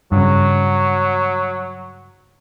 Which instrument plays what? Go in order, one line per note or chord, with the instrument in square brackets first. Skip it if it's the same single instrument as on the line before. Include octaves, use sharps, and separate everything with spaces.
[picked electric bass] G2 C#3 [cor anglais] F#3